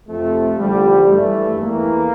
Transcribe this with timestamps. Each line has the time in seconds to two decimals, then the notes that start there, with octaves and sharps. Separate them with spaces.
0.08 F2 C3 F3 A3
0.58 E2 D3 F3 G3
1.08 G2 E3 A3
1.58 E2 E3 A#3